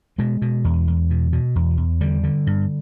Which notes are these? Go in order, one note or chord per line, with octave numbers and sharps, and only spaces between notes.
B2 G#3
B2
E2
E2
B2
B2
E2
E2
D3 G3
D3
G2